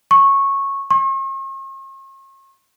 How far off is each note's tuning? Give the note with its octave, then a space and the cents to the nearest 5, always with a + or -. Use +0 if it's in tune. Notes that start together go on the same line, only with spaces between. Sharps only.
C#6 -10
C#6 -45